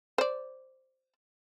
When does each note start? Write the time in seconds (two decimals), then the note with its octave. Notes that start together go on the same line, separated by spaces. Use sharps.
0.18 C5 D5